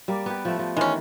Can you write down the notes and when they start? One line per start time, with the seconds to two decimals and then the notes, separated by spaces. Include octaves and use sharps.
0.08 G3 A#3 D5
0.26 B3 G4
0.45 F3 A3
0.59 F3
0.77 D#3 E3 G#3 C#4